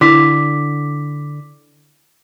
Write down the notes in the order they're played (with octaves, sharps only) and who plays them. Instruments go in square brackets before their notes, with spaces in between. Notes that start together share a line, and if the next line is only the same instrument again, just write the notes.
[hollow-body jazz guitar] D3 [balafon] E4 [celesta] D6 B6